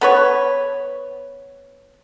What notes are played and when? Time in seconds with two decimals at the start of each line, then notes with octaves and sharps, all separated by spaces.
0.01 B3 B4 C#5